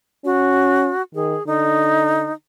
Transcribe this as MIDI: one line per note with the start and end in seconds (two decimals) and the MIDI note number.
0.25 0.90 61
0.25 1.02 66
1.15 1.35 51
1.15 1.45 68
1.47 2.30 50
1.47 2.33 63